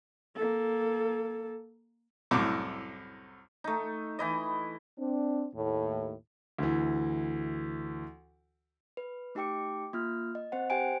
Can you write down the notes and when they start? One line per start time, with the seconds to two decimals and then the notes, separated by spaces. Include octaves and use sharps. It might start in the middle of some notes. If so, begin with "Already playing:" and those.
0.35 A#3 A4
2.31 C2 F#2 A2 D6
3.64 A3 D#4
4.19 E3 E4 D#5
4.98 C4 D4
5.55 D#2 A2
6.58 D2 E3
8.97 B4
9.35 A3 D#4 G4 G5 D6 C#7
9.93 A#3 F4 F6
10.35 D#5
10.52 C4 C5 F#5
10.70 G4 C5 G5 G#5 D7